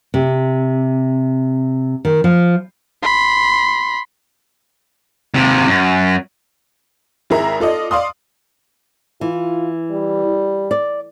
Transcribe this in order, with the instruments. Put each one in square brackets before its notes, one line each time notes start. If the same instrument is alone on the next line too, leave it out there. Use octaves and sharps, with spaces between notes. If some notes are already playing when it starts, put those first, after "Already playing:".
[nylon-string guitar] C3
D#3
F3
[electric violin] B5 C6
[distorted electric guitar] D#2 C3
F#2
[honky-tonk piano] G#1 E4 G#4 A#4 E5 A#5
F4 A4 D5 D#5
D5 F5 C6 D#6
[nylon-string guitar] E3 [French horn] F4
[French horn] G3
[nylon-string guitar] D5